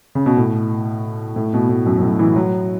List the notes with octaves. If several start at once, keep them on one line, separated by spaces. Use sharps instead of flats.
C#3
B2
A2
A2
B2
A2
F#2
F#2
A2
E3
F#3